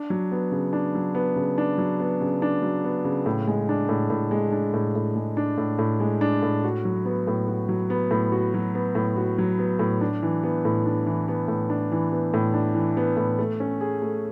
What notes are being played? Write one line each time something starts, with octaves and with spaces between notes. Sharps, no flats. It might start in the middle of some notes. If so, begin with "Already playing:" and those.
Already playing: D4
F#3
B3
C#3
D4
F#3
B3
C#3
D4
F#3
B3
C#3
D4
F#3
B3
C#3
A2
G#3
D4
A2
A2
G#3
D4
A2
A2
G#3
D4
A2
A2
G#3
D4
A2
F#4
F#3
B3
A2
F#4
F#3
B3
A2
F#4
F#3
B3
A2
F#4
F#3
B3
A2
D4
E3
B3
A2
D4
E3
B3
A2
D4
E3
B3
A2
D4
E3
B3
A2
A3
C#4
G#4
A3